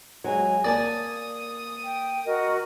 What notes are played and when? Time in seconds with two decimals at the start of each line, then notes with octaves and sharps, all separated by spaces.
0.24 F#3 G#3 G#5
0.64 A#3 D5 G#5 A5 D#6
1.84 G5
2.25 F#4 A#4 D#5